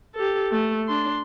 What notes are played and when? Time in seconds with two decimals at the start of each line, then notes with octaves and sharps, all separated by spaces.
0.15 G4 A4
0.51 A3
0.88 D4 C6